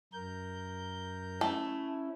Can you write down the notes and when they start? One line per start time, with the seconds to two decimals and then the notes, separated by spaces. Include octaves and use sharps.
0.13 F#2 A#4 G6
1.41 A3 C#4 E4